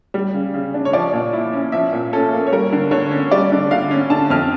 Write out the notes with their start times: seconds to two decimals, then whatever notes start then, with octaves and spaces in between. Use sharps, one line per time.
0.14 G3
0.34 C#3
0.54 C#3
0.74 D4
0.85 C#5
0.93 F3 D5
1.13 A#2
1.33 E4
1.53 C#4
1.72 F3 E5
1.93 A#2
2.13 C#4 A4
2.33 A#3
2.47 C#5
2.52 G3 A#4
2.72 D3
2.91 D3 C#5
3.11 C#4
3.31 G3 D5
3.52 D3
3.71 D3 F5
3.91 C#4
4.10 D3 A5
4.30 F2 F6